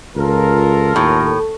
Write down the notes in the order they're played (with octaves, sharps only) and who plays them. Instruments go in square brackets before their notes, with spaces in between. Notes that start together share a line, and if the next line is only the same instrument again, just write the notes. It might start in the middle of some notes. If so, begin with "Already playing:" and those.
[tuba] C#2 [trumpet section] F4 A4 A#4
[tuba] D#2 [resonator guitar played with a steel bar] A2